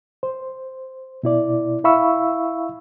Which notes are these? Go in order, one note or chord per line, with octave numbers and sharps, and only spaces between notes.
C5
B2 E4 D5
E4 E5 F5 B5 C#6 E6